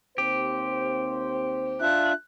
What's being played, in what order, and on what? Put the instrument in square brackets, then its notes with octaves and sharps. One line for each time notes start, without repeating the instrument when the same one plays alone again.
[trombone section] D#2 C4 C5 [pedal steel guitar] G4
[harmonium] D4 F4 E5 [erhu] F#6